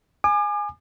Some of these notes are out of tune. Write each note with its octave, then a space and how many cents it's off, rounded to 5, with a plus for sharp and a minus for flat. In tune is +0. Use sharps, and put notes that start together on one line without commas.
G#5 +0 D6 +40